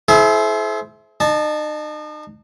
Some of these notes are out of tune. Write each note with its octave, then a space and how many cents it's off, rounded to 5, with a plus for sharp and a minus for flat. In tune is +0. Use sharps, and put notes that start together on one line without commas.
E4 +0 G#4 +45 C5 +0
D#4 -40 A5 -10